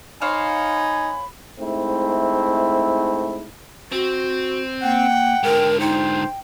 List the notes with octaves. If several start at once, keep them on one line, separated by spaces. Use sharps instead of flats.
D#4 C5 C#5 F5 G#5 B5
G#2 A3 C4 E4
C4 F#4
A#3 F#5 G5
G#2 D3 A#4
D#4 C5 G5